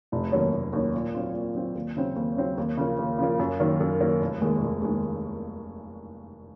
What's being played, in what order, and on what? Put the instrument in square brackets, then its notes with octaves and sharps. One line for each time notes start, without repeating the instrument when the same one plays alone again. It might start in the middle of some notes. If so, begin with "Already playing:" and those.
[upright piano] F1
D#2 D#3 F#3 C#4
F1
D#2 D#3 F#3 C#4
A#2
F#3 C4 F4
A#2
F#3 C4 F4
D#2
C#3 F#3 C4
D#2
C#3 F#3 C4
D#2
C#3 F3 A#3
D#2
C#3 F3 A#3
F#2
D#3 F#3 A#3
F#2
D#3 F#3 A#3
F1
D#2 D#3 G#3
F1
D#2 D#3 G#3